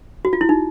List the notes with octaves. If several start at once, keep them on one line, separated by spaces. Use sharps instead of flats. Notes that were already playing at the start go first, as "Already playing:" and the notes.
F#4
F4
E4
D#4